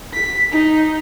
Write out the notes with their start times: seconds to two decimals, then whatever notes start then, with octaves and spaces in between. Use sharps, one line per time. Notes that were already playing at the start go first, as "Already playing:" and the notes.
0.14 B6
0.52 D#4